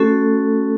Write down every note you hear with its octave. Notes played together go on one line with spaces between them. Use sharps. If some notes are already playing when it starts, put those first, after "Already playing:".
Already playing: A3 C#4 F#4 A4